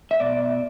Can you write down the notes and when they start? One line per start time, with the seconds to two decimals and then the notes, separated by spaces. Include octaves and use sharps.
0.11 E5
0.20 B2 D5